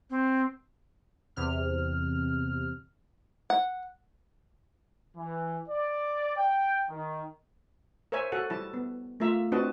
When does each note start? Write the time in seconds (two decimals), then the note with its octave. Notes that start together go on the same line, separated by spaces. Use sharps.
0.10 C4
1.36 E2 C3 F6
3.50 F#5
5.16 E3
5.69 D5
6.37 G5
6.90 D#3
8.12 A#4 C5 C#5 E5 G#5
8.32 F#4 A4 F#5 G#5
8.50 G3 E4 A5
8.74 B3
9.20 A3 A#3 F4 E5 A#5
9.52 C4 D4 F#4 B4 D#5 A5